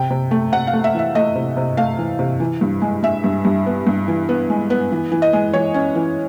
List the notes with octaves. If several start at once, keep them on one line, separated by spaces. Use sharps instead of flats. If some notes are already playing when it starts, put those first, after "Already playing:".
Already playing: C3 G5
C3
A3
C3 F#5
F5
A3
E5
E3 E5
A3 D#5
C3
C3
A3 F5
E3
C3
E3
G2
G#3
G#3 E5
G2
G2
B3
G2
E3
B3
G#3
B3
E3
E3
D#5
G#3
E3 C#5
C#4
E3